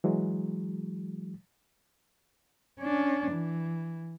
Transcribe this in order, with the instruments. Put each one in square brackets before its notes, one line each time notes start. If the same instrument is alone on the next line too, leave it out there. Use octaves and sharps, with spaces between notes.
[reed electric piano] E3 F#3 G#3
[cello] C#4 D4
E3